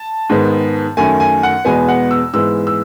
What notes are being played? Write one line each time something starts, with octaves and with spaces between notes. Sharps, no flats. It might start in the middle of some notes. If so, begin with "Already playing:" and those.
Already playing: A5
G#2 D#3 G#3 B3
F#2 D#3 A3 G#5
G#5
F#5
E2 B2 G#3 B3 G#5
F#5
E6
G#2 E3 G#3 B3 E6
E6